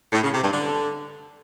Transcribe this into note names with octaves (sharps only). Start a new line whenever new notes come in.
A2
C#3
C3
G2
D3